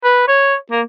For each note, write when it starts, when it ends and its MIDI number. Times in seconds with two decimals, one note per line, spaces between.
0.04 0.27 71
0.28 0.55 73
0.71 0.81 58